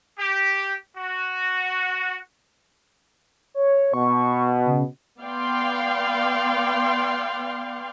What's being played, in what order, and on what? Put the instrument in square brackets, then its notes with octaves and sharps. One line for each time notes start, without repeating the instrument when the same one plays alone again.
[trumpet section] G4
F#4
[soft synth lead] C#5
[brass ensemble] B2 [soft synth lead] C#6
[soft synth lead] C#3
[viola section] B3 D5 F5 G5 C6